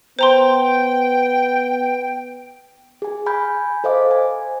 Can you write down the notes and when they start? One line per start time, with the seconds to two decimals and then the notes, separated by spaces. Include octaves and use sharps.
0.19 B3 C5 G5 A#5 C6
3.02 G#4 G#5
3.26 G#5 B5 F6 G6
3.84 A4 C5 D#5 F5 D6
4.11 G#5